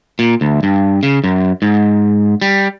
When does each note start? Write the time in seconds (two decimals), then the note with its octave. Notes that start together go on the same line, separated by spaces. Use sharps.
0.19 A#2
0.41 D2
0.63 G2
1.03 C#3
1.24 F#2
1.62 G#2
2.42 G3